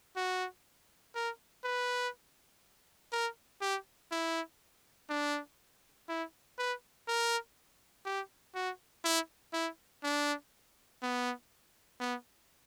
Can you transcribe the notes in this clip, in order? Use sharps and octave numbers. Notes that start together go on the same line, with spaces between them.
F#4
A#4
B4
A#4
G4
E4
D4
E4
B4
A#4
G4
F#4
E4
E4
D4
B3
B3